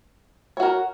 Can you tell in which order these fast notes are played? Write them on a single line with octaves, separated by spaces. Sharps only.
C#5 F#4 A#4